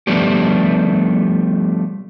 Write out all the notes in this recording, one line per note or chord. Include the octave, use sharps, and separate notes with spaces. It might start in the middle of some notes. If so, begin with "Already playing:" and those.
F3 G3 A3 B3 D4 G4